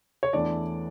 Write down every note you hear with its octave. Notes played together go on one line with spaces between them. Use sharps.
C#5
E2 E3 A3 D4 D5